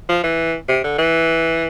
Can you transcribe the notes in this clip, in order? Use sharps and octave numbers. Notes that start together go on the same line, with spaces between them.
F3
E3
C3
D3
E3